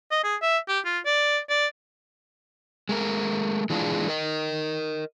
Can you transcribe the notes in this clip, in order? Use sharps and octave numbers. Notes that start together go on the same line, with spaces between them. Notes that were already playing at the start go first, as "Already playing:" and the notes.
D#5
G#4
E5
G4
F4
D5
D5
G#3 A3 A#4
E3 G#3 D4 F4 G#4
A#4 D#5